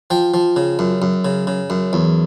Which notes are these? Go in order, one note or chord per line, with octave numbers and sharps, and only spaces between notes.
F3 G5
F3
C#3
F#2
F#2
C#3
C#3
F#2
E2